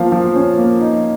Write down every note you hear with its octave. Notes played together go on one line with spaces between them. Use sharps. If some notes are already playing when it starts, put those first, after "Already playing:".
Already playing: F3 A#3 F5
F3
C#4
A#3
D#4